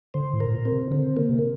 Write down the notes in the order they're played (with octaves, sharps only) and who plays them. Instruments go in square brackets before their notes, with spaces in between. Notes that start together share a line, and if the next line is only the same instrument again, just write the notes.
[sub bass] D3 [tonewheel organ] C5
[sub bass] A2
[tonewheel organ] A#4
[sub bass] A2
A#2
[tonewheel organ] C4
[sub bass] C3
[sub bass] D3 [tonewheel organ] C4
[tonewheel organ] A#3
[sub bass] C3